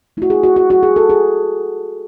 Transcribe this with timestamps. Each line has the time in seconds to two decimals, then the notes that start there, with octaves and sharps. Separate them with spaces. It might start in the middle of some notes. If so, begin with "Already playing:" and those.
0.17 F#3 A3 E4 F#4
0.30 G#4
0.43 F#4
0.56 F#4
0.70 F#4
0.83 G#4
0.96 A4
1.09 G#4